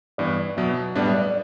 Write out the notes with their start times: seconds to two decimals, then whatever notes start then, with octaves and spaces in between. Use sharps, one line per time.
0.18 G2 E3 B3 D5
0.57 B2 F#3 B3 E5
0.95 A2 G3 B3 D4 D5
1.05 E5
1.15 D5